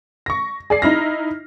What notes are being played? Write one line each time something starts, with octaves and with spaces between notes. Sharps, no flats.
C#6 A#6
G#4 D5 C7
D#4 E4 F6 A#6